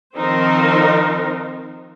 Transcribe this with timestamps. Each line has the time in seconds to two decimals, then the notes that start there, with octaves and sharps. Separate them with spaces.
0.16 D#3 F3 C4 D#4 A#4 C5